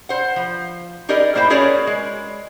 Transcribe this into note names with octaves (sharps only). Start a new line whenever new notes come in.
C5 F#5
F3
D#4 G4 G#4 A#4 D5 D#5
A2 A#3 E4 C5 F5 G5
C#4 F#4 G#4 A#4 C#5 D5
G#3